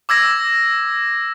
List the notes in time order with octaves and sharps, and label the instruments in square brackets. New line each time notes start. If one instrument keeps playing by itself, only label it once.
[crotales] D6 E6 G#6 A#6